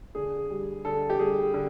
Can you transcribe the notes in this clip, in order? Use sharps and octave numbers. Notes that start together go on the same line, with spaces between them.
D3 G#4
G3
D3 A4
G4
G3 G#4
D3